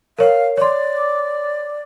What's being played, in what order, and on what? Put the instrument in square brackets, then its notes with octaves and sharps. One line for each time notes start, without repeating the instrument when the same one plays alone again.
[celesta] A#4 C#5 [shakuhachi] F5
[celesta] C#5 C6 [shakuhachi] D5